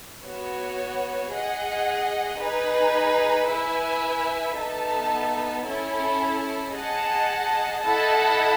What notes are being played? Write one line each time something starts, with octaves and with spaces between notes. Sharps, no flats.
B3 F#4 C#5
G#4 D#5 F#5
D#4 G#4 B4
E4 B4 E5 G#5
B3 D#4 A4 E5 A5
C#4 E4 A4
G#4 D#5 F#5 A5
E4 A4 D#5 F#5 A5